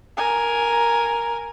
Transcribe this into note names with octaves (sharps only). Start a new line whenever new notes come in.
A#4 G#5